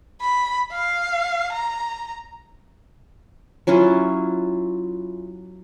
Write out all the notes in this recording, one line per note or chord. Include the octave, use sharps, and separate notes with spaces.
B5
F5
A#5
F#3 C#4 E4 F4